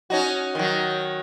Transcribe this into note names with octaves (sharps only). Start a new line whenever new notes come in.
C#4 D#4 F#4
D#3 F#3